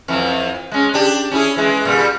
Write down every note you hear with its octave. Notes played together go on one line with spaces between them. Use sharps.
F2 E3
G#3 C#4
D4 G4
C#4 E4 G#4
E3 G#3
A#2 G3